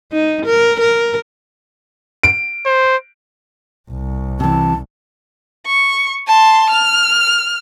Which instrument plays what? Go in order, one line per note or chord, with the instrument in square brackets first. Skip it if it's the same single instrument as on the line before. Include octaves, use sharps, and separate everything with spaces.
[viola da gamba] D#4
A#4
A#4
[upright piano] D7
[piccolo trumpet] C5
[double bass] C2
[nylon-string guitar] C3 E3 [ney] A5
[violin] C#6
A5 C6
F6